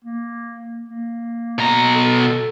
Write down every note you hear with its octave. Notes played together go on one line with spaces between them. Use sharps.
A#3
A#3
B2 A#5
A4